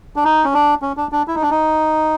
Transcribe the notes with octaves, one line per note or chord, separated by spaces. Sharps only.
D4
D#4
C#4
D4
C#4
D4
D4
E4
D#4
D4
D#4